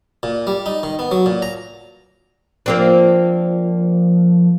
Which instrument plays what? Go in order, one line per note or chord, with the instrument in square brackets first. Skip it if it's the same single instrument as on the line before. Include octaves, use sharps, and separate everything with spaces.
[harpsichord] A#2
G3
D#4
D#3
B3
F#3
A#2
A#5
[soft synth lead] F3 [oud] A#3 C4 D4